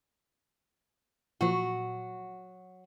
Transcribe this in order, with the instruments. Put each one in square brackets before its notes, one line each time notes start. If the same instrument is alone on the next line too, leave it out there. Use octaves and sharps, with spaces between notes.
[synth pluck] A#2 F3 [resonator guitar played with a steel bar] F#3 F#4